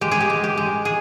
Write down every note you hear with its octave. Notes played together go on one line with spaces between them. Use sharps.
G#3 G4
G#4
G4
G#3
G4
G#3
G#4